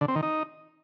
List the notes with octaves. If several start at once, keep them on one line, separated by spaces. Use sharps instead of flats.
D3
C4
D#3
D#4